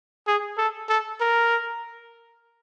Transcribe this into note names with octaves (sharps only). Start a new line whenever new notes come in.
G#4
A4
A4
A#4